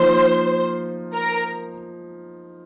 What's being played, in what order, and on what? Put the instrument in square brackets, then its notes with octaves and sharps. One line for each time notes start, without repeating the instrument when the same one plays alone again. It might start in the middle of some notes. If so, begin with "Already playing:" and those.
Already playing: [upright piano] F3 A#3 D#4 [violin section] C5
[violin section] A#4